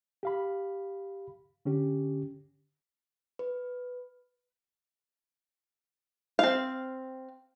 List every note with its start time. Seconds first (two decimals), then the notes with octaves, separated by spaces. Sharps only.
0.23 G4 F5 B5
1.65 D3 C#4 G4
3.39 B4
6.39 C4 F5